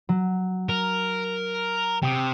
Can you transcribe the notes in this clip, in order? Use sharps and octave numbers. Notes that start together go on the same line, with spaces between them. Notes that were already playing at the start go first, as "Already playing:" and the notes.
F#3
A#4
C3 G5 D#6